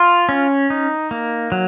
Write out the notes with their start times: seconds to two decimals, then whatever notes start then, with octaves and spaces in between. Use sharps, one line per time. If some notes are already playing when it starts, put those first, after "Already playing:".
Already playing: F4
0.29 C#4
0.70 D#4
1.11 A#3
1.52 F#3